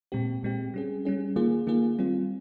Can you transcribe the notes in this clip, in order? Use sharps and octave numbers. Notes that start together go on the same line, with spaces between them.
A#2 G#3 C4 G4
A#2 G#3 C4 G4
G3 C#4 G#4
G3 C#4 G#4
D#3 A#3 F4 G#4
D#3 A#3 F4 G#4
G3 C4 F4